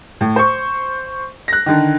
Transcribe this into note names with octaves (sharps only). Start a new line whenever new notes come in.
A2
C5 C#6
F#6 A#6
D3 D#3